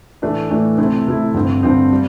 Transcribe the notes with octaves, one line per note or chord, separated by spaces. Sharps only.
A2 E3 A3 D4
A2 E3 A3 D4
C3 A3 C4 E4
C3 A3 C4 E4
G2 D3 C4
G2 D3 C4
G3